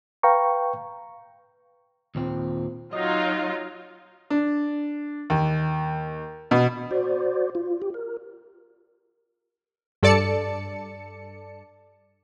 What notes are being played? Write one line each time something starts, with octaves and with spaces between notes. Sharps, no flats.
B4 F5 G5 A#5 C#6
D#2 A#2 C4
F#3 D#4 F4 D#5
D4
D#2
B2
F#4 C5 D5
F4
G4
A#4
G2 A4 D5 A5 C#7